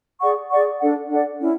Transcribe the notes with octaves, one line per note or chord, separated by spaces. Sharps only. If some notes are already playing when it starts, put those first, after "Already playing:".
G#4 D5 F#5 C#6
G#4 D5 F#5 C#6
D4 A4 D5 F#5
D4 A4 D5 F#5
C#4 E4